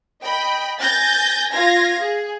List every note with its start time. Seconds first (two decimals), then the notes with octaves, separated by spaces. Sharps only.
0.23 D#5 G5 B5
0.80 G#5 G6 A6 A#6
1.52 F4 F5 G#6 A#6
2.01 G#4